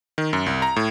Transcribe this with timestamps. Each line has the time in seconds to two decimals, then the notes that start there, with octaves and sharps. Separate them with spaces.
0.18 D#3
0.33 F#2
0.46 C2
0.62 A#5
0.76 A2